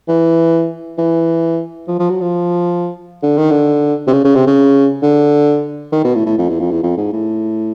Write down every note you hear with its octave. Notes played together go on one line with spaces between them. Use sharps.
E3
E3
F3
F3
F#3
F3
D3
D#3
D3
C3
C#3
C#3
C3
C#3
D3
D#3
B2
A2
A2
F2
E2
F2
E2
F2
G#2
A2